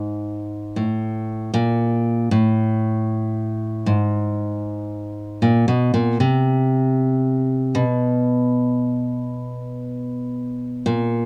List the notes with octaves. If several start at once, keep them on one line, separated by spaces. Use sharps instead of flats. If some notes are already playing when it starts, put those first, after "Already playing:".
Already playing: G#2
A2
A#2
A2
G#2
A#2
B2
A#2
C3
B2
A#2